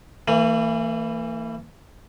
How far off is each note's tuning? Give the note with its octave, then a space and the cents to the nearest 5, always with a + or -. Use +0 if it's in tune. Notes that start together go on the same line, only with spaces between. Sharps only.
E3 -5 A#3 -45